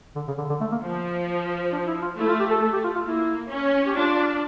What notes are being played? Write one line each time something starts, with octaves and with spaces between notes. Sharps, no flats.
D3
C#3
D3
D3
A3
A#3
F3
D4
E4
F4
A3 E4
F4
G4
A4
A3 A4
G4
F4
F4
A#3 E4
C#4
G4
D4 F4